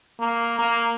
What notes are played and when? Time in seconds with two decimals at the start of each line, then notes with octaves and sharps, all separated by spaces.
0.20 A#3
0.59 A#3